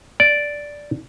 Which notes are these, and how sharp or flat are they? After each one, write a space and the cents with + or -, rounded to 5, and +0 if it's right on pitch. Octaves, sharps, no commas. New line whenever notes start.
D5 -5